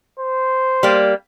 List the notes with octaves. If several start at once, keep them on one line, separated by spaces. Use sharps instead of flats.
C5
G3 A#3